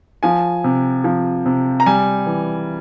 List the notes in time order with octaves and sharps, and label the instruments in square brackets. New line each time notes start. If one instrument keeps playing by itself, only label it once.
[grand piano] F3 G#5
C3
F3
C3
A#5
G3 G#5
E3